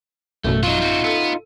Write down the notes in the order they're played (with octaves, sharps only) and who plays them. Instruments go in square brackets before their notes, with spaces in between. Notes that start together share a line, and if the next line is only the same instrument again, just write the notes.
[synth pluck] A1 F#2 B2 [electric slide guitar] A3
[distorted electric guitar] F#3 [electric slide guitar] D#4 F4
[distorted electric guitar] C4 F#4
[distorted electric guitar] B3 [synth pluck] A4